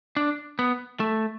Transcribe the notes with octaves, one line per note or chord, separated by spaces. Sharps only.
D4
B3
A3